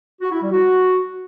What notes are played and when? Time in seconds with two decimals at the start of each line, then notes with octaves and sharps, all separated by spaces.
0.21 F#4
0.31 E4
0.41 G3
0.51 F#4